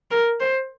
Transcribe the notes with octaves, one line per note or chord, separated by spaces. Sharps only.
A#4
C5